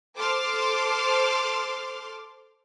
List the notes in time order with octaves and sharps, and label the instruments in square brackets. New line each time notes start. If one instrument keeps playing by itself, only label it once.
[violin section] A4 C5 C6 D6 F6